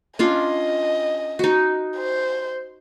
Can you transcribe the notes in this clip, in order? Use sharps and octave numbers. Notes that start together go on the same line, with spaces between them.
C#4 D4 F4 D#5
D#4 F#4
C5